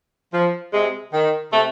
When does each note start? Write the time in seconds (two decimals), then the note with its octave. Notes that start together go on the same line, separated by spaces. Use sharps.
0.33 F3
0.73 C3 G#3
1.13 D#3
1.53 C3 A3